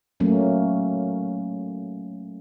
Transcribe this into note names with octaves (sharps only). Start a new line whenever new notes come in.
F#3 A3 A#3 C#4